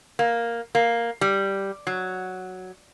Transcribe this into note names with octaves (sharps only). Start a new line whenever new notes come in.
A#3
A#3
G3
F#3